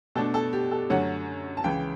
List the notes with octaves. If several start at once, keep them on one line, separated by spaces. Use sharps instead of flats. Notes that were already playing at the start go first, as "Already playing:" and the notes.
B2 A3 D4 A4
A4
G4
A4
F#2 D3 F#3 A3 C#4 F#5
A5
C#2 C#3 E3 G5